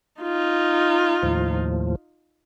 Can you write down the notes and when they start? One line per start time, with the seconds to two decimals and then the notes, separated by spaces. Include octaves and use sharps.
0.21 D#4 F4
1.23 D#2 A2 F3